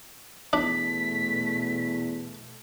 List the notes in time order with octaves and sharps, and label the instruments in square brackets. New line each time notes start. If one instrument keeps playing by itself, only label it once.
[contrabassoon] E2 [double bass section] B2 A3 [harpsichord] D4 [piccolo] B6